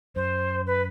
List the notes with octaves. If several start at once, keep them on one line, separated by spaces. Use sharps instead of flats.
F#2 C5
B4